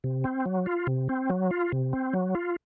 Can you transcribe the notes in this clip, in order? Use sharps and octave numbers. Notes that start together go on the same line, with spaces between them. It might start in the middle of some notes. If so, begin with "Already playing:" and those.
C3
C4
F#3
F4
C3
C4
F#3
F4
C3
C4
F#3
F4